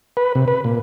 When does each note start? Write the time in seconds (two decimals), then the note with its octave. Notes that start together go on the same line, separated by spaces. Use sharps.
0.17 B4
0.35 C3
0.48 B4
0.64 A#2